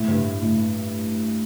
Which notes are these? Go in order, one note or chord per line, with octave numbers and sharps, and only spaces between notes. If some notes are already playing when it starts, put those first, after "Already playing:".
Already playing: A2
G2
A2